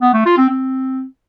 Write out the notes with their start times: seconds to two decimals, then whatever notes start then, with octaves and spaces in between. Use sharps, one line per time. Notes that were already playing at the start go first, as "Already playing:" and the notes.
0.02 B3
0.14 A3
0.26 F4
0.38 C4
0.50 C4